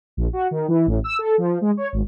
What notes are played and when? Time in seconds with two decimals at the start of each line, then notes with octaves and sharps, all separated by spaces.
0.17 A#1
0.33 F#4
0.51 D#3
0.68 E3
0.87 A1
1.04 E6
1.19 A4
1.38 F3
1.61 G#3
1.77 C#5
1.93 G#1